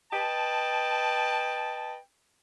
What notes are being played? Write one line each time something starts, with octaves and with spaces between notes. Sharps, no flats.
B4 D#5 G5 A5